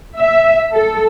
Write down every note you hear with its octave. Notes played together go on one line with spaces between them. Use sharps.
E5
A4